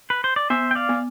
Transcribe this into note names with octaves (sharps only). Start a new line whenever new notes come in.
B4
C5
D5
B3 C5 E5
G5
D5 F5
B3